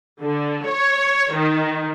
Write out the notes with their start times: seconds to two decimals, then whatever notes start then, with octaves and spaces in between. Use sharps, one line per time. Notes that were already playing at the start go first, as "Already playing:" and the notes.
0.23 D3
0.66 C#5
1.33 D#3